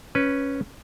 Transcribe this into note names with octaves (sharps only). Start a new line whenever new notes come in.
C#4 B4